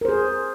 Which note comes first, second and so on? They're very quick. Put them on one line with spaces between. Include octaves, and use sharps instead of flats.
A#4 C5 G#4